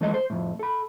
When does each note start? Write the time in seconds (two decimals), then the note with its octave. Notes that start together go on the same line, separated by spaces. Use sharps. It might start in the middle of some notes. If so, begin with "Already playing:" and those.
0.01 E3 G#3 A3 A4 B4 D#5
0.14 C5
0.30 F2 A2
0.59 A4 B5